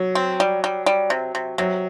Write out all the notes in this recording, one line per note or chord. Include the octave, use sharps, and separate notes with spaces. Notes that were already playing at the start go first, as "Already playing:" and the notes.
Already playing: F#3
C4
G3
G3
G3
C3
C3
C3 F#3